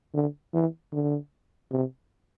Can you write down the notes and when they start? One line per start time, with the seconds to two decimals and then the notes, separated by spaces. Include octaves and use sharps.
0.14 D3
0.54 E3
0.92 D3
1.71 C3